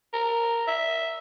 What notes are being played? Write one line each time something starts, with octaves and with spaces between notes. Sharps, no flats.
A#4
E5